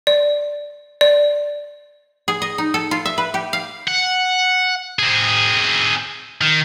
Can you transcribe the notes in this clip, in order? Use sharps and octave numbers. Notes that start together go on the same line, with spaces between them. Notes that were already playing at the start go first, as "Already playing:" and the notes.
D5
D5
G#4
D#5
D#4
A4
F4
E5
B4
G4
F5
F#5
C4 G#4
D#3